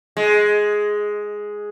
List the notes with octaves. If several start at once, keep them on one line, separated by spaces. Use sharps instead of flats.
G#3